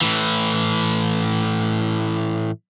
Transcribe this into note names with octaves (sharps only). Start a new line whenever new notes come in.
A2 E3